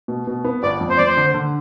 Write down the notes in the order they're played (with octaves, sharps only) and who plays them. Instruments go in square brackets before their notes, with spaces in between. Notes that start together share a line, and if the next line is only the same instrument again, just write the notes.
[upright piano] B2
B2
B3
[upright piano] G1 [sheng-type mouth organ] D5
[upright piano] F2
[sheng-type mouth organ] C5
[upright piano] F2 [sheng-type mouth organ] D5
[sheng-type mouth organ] C5
[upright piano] D3
D3